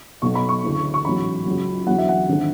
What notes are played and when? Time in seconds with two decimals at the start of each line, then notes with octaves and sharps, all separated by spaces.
0.22 B1 B2 F#3 C#6
0.35 B5
0.49 C#6
0.64 D2 C#3 E3
0.94 C#6
1.05 A1 G#2 F#3 B5
1.46 C#2 C#3 F#3
1.87 E2 D3 F#3 F#5
1.98 E5
2.09 F#5
2.28 G#1 D3